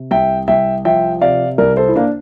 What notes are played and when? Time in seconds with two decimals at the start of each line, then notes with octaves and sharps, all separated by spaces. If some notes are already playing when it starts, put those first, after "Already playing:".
Already playing: C3
0.11 C2 E5 G5
0.48 C2 E5 G5
0.85 F3 E5 G5
1.21 C3 D5 F5
1.58 C2 A#4 D5
1.77 A4 C5
1.88 E4
1.95 A#3 D4